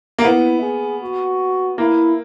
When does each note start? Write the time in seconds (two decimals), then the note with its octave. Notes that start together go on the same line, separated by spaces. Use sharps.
0.19 A#3
0.24 B3 E4
0.62 G#4
1.02 F#4
1.78 A#3 E4